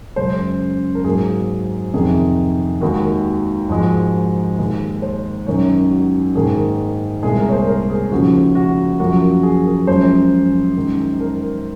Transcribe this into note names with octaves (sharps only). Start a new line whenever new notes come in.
F#2 C#3 G#3 C5
A#4
G#2 F#3 A#3 G#4
F2 C3 D#3 G#4
D#2 D#3 G#3 F#4
G#2 F3 G#3 F#4
D#2 D#3 G#3
C5
F#2 D#3 G#3 C#5
F#4
G#2 D#3 A#3 G#4
C2 A#2 G#3 G#4
A#4
C#5
C5
A#4
G#4
D#2 C#3 F3 F#4
F#4
F#2 F3 A#3 F#4
G#4
A#4
F#2 F3 G#3 C5
F#2 D#3 G#3
A#4